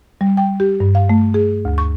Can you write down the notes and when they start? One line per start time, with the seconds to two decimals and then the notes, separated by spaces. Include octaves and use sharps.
0.21 G3
0.37 G5
0.60 G4
0.80 G2
0.95 F5
1.09 A3
1.34 G#4
1.65 D2
1.78 C#6